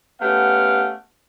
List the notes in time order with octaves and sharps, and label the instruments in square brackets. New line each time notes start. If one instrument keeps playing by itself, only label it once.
[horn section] A3 B3 C#4 G4 F5 F#5